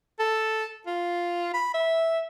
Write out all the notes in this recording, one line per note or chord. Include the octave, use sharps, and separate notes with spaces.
A4
F4
B5
E5